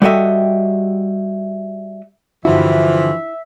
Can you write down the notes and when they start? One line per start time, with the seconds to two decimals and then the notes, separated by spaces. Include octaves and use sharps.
0.02 G3 F#4 G4 A4 D#5 E5
2.45 G2 D3 E3 F3 E4 F#4 E5